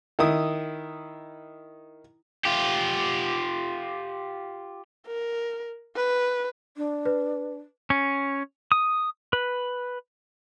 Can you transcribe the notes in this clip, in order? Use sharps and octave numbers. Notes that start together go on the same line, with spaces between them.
D#3 E4 D#6
F4 G4
A#4
B4
D4
B4
C#4
D#6
B4